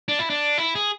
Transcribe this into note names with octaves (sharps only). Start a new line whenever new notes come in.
D4
E4
D4
E4
G#4